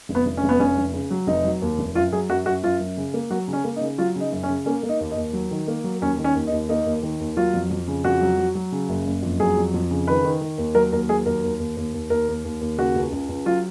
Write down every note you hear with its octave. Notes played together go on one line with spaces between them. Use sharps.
F1
B3
F1
C#4
F1
B3
F1 C#4
F1
C#3
F#3
F1 D#4
F#3
D#2
F1
F#2 F4
F#3 G#4
F#2 F#4
F#2 F#4
F#2 F4
F#2
C#3
A#3
F#3 F#4
C#3
C#4
A#3
D#4
C#3
F#3 F4
C#3 D#4
F#2
C#4
C#3
A#3 C#4
A#3
D#4
D#2
D#4
D#2
F#3
D#3
A#3
F#3
D#2 C#4
D#3
C#4
D#2
D#4
D#2
A#3 D#4
D#2
D#3
D#2
F#3 F4
F2
F2
C#3
F2 F#4
F#3
F#3
F#3
C#3
F#1
F#1
F2
F#3 G#4
F2
F2
C#3
D#3 B4
D#3
D#3
D#2
F#3 A#4
D#2 A#4
F#3 G#4
D#2 A#4
D#2
D#2
D#2
D#2
D#2 A#4
D#2
D#2
D#2
C#3 F#4
C#2
C#2
C#2
F#3 F4